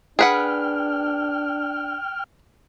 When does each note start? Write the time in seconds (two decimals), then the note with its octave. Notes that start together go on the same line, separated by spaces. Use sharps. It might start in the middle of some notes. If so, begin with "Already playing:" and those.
0.19 D4 G#4 B4 F#5 G5 F6